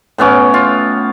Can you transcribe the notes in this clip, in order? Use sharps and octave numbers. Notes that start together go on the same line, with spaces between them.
A2 B3 C#4 D6
F4